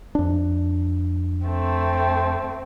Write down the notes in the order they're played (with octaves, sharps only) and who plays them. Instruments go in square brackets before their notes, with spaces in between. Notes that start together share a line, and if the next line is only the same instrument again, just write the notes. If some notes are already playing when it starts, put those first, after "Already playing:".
[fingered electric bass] F2 D4
[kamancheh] A3 C4